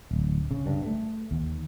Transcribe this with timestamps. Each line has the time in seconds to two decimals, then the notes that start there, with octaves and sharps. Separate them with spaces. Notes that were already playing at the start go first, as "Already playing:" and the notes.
0.11 D1
0.51 C#3
0.66 G2
0.85 A3
1.31 D#2